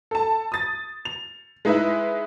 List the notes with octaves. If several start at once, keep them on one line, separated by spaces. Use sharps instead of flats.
A4 A5
D#6 A6
F7
G#3 D#4 E4 B4 E5